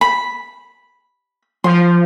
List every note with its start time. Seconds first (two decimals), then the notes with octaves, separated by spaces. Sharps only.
0.01 B5
1.64 F3 C6